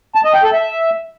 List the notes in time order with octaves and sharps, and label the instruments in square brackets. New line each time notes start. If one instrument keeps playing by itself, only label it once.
[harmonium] A5
D#5
G5
A4
E5